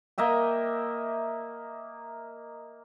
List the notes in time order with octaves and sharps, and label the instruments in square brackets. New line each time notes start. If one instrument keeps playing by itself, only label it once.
[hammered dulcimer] A#3 D#5 E5 G5